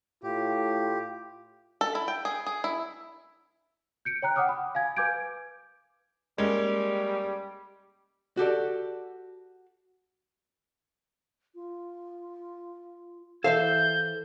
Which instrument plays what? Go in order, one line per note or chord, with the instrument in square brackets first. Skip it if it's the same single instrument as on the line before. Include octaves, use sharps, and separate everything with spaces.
[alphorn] A2 [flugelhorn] F4 [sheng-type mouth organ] G4
[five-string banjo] A4
E4
G5
G#4
G#4
E4
[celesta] G6 C#7 D7
C#5 G5 A#5 F#6
F#5 G5 D6 D#6 F6
B5
F5 G#5 G#6
B4 G#5 D6 G6 G#6 D7
[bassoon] G3 [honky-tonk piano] G#3 A#3 C#4
[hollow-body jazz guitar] F#4 G4 A4 D5
[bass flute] F4
[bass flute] E3 [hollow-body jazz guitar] A4 C5 E5 [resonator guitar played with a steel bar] F5 [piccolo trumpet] G6